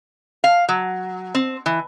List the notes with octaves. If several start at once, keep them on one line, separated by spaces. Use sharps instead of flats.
F5
F#3
C4
E3